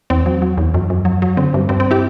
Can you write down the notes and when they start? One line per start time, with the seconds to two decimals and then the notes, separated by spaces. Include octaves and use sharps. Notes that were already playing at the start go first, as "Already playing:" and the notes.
0.10 E2 C4
0.26 F#3
0.42 F#3
0.58 E2
0.74 F#2
0.90 F#2
1.05 F#3
1.22 F#3
1.37 D3 C4
1.54 G2
1.69 G2 C4
1.80 C4
1.91 E4 G4